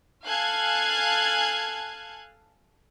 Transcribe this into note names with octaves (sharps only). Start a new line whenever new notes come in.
A4 F5 G#5 A5 F#6 G#6